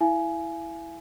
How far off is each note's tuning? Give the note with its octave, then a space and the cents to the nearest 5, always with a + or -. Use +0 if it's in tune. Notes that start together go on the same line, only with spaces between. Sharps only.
E4 +0 F5 -45 G#5 +15